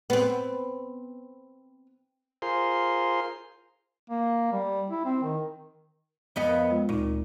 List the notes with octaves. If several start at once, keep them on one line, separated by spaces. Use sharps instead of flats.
B3 C4
F4 G#4 A#4 C5 C6
A#3
G3
E4
C4
D#3
F2 B3 D#5
A#4 F5
G#3 F4
D2 A#2 D#4 C#6